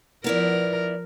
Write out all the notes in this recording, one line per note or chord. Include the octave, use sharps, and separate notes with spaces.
F3 B3 E4 A#4 D5